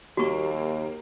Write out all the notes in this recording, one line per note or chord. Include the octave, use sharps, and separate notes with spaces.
D#2 G3 A#3 F#4 C#6